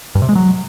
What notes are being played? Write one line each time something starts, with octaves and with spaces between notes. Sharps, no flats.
G2
C3
G#3
F#3